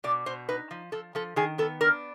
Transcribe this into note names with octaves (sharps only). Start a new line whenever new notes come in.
B2 D5
B2 C5
D#4 B4
F3
F3 A4
F3 A4
D#3 G#4
B3 A4
D4 A#4